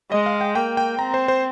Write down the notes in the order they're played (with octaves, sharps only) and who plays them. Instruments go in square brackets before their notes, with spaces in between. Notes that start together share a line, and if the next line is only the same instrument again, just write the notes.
[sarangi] G#3 [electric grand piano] D#5
[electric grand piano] F5
G5
[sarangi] A#3 [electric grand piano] G5
[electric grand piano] G5
[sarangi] C4 [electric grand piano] A#5
[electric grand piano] C5
C5